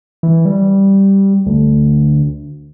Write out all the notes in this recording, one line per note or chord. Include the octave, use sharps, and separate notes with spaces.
E3
G3
D2